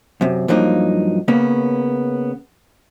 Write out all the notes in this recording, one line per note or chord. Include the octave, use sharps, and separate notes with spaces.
F#2 C3
G2 F3 F#3 A#3 D#4
C#3 A#3 B3 C#4